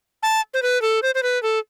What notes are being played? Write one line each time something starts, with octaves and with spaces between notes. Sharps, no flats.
A5
C5
B4
A4
C5
C5
B4
A4